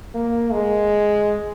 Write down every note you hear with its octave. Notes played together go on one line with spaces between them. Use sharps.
A#3
G#3